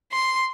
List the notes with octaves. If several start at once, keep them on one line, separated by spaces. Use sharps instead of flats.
C6